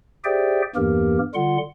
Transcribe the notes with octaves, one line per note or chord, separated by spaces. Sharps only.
G4 G#4 C5 D5 E5 G5
E2 G2 E3 A#3 G4 A#4
D3 G3 F4 F#5 C6